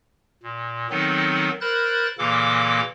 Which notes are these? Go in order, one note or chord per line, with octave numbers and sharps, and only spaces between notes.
A#2
D#3 F#3 B3 C4 D#4 A4
A#4 C5 B5 F#6 A6
A#2 C#3 E3 A#3 A4 D6